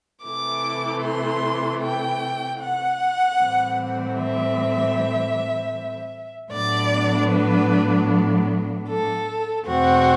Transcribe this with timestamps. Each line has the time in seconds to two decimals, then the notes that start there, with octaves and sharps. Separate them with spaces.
0.24 C3 E3 A3 D6
1.03 C6
1.81 G5
2.59 F#5
3.38 A2 E3 G3 C4
4.16 E5
6.52 A2 F#3 B3 D4 D5
7.31 B4
8.87 A4
9.66 E2 B2 A3 C4 F#4